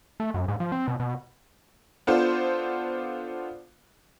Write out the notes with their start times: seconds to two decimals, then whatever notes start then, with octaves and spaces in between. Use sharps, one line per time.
0.20 A3
0.34 F#2
0.48 G#2
0.60 F3
0.72 C4
0.88 B2
1.00 B2
2.07 B3 D4 F4 A4 C5